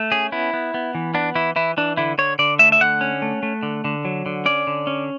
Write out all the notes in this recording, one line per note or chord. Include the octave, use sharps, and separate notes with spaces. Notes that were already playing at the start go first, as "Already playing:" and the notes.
Already playing: A3
C#4 G#4
B3 E4
B3
B3
E3
B3 D4
E3 E4
E3 E4
E3 D4
D3 E4
D3 C#5
D3 D5
A3 E5
E5
D3 F#5
C#4
A3
A3
D3
D3
F#3
D3
C#4 D5
D3
C#4